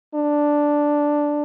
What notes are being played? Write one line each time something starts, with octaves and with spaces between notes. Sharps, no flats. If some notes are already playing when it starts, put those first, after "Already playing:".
D4